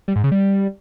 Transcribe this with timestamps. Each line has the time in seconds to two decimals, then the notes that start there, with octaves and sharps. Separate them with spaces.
0.08 G3
0.16 G#2
0.24 C#3
0.32 G3